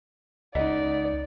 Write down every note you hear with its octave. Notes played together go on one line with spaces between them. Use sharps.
C#2 D#4 D5 D#5 F#5